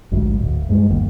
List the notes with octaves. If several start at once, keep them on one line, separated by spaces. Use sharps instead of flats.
A1 D2 G#2 F#3
D1
G2 G#3
G1 D#2 D#3 A#3